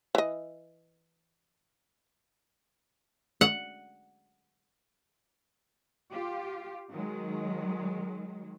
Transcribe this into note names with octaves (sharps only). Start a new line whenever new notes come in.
E3 D#5
F#5
F4 G4
D#3 F#3 G#3